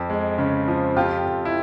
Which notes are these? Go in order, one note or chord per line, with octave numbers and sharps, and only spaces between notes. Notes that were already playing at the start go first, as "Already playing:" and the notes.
Already playing: F2
G#3
C#3
F3
F2 F4 G4
F2
E4